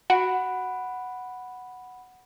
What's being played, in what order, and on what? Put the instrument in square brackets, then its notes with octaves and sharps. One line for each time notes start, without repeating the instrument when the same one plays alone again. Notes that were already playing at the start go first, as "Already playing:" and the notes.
[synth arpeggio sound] F#4 [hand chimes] F#5 B5 D7